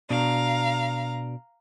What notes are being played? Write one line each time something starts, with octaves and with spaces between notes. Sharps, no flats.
B2 D4 F5 A#5